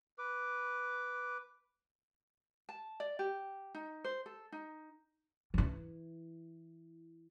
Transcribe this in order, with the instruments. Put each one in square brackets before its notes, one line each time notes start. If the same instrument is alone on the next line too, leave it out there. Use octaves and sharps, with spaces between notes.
[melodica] B4 D6
[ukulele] A5
D5
G4
D#4
C5
A4
D#4
[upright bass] E3 E4